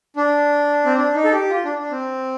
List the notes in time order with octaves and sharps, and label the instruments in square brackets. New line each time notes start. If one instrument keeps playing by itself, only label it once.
[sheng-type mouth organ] D4
C4
D4
D#4
A4
G4
F4
D4
D4
C4